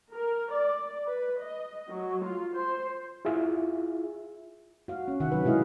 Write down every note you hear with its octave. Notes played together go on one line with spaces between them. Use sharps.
A#4
D5
B4
D#5
F#3
F4
C5
E4 F4 G#4 E5
F#4 F5
C#4
C3 D#3 E5 F#5
F#3 B4
B2 G#3 E4 G#4 D#5 F5